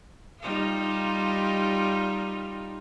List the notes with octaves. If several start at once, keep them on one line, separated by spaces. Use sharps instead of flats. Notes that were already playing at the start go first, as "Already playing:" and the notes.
G3 D#4 F4